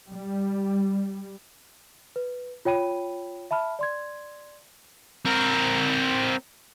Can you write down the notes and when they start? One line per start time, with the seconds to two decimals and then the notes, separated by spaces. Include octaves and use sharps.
0.10 G3
2.16 B4
2.65 F4 C#5 G5 B5 D#7
3.51 E5 A5 B5 F6
3.79 D5 C6 G#6
5.25 C4 A#4